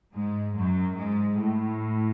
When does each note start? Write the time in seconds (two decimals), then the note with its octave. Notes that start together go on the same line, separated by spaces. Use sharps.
0.15 G#2 G#3
0.56 F#2 F#3
0.96 G#2 G#3
1.37 A2